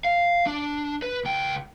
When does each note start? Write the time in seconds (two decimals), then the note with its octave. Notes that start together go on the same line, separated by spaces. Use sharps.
0.05 F5
0.47 D4
1.02 B4
1.25 C#2 G5